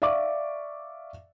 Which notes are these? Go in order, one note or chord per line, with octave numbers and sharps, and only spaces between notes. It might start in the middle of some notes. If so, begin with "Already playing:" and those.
D5 E5 F5 C#6 D6